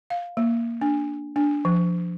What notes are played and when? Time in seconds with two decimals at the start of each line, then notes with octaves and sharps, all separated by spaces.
0.10 F5
0.37 A#3
0.81 D4
1.36 D4
1.65 F3